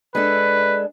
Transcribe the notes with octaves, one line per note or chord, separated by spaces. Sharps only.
G#3 D4 A4 B4